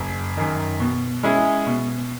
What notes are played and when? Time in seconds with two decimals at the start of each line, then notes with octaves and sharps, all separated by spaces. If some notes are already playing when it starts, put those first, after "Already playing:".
Already playing: F#1
0.37 F#2 D#3
0.80 B2
1.23 G#3 C#4 E4 G#4
1.67 B2